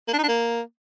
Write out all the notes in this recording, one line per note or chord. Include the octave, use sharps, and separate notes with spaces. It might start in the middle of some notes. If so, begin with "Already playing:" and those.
A#3
D4
D#4
D4
A#3